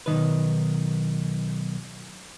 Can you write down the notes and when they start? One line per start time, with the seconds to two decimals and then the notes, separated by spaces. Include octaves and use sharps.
0.06 B1 E2 D#3 B4